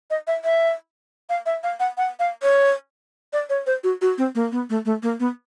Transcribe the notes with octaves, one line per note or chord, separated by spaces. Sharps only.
D#5
E5
E5
F5
E5
F5
F#5
F#5
F5
C#5
D5
C#5
C5
F#4
F#4
C4
A#3
B3
A3
A3
A#3
B3